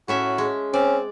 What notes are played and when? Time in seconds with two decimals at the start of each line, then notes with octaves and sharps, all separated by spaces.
0.08 A2 C#4 F#4 E5
0.38 G#3
0.74 C4 C#4 D5